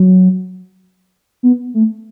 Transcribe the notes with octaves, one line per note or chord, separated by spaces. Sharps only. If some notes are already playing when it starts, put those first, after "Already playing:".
Already playing: F#3
B3
A3